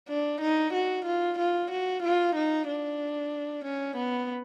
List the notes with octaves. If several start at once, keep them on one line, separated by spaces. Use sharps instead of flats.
D4
D#4
F#4
F4
F4
F#4
F4
D#4
D4
C#4
B3